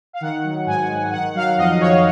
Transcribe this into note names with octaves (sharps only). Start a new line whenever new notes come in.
F5
D#3 F#5
F#3
G#2 G#5
G#2
D#3 F#5
F#3 F5
F2 D#5
F2 C#5